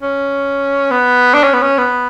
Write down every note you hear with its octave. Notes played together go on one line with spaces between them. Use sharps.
C#4
B3
D4
C#4
B3
C#4
B3